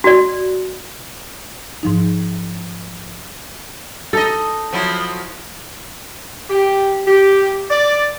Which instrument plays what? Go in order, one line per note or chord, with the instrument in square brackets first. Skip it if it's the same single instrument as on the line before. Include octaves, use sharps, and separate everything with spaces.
[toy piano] F#4 D5
[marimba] G#2 F3 D#4
[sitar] D#4 D#5 [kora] A4
[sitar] F3 F#3 E4
[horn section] G4
G4
D5